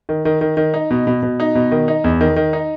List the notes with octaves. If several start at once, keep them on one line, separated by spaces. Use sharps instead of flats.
D#3
D#3
D#3
D#3
D#4
B2
B2
B2
D#4
B2
D#3
D#4
E2
D#3
D#3
D#4